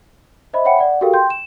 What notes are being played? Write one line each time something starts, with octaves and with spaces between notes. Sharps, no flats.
C5 D#5 E5 B5
C#5 E5 F#5 G5 B5 C#7
D5 F#5
F#4 G4 A4 A#4 F5 G5
G5 C6 G6
E7